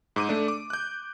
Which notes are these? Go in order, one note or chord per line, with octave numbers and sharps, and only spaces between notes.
G#2 D6 D#7
A3 D4
D6
F#6 G6